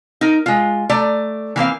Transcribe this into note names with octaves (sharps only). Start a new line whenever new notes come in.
D#4 A#4
G#3 F4
A3 D5 A#5
E3 A#3 C4 F5